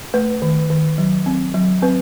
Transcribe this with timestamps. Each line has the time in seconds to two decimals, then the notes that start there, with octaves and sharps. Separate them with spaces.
0.14 A3 B4
0.42 D#3
0.70 D#3
0.98 F#3
1.26 C4
1.54 F#3
1.82 C4 B4